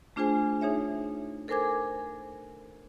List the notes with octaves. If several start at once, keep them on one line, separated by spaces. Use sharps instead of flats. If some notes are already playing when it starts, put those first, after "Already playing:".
A3 D4 F4 G#4 C5 G#5
D#4 G#4 C#5 E5
A4 A#4 C5 G#5 D6 G#6